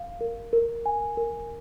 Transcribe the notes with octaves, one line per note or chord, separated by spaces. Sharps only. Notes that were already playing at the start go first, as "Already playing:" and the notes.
Already playing: F5
A#4
A#4
G#5
A#4